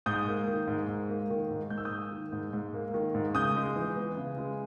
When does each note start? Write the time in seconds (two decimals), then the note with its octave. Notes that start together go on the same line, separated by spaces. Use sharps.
0.06 G#2 D#6 G6
0.28 A#3
0.48 D#3
0.67 G#2
0.89 G#2
1.09 A#3
1.30 D#3
1.50 G#2
1.70 G#2 G6
1.78 E6
1.85 D#6 G6
1.92 A#3
2.12 D#3
2.32 G#2
2.53 G#2
2.74 A#3
2.94 D#3
3.14 G#2
3.35 C#3 D#6 G6
3.56 G#3
3.76 E3
3.96 B3
4.17 C#3
4.38 G#3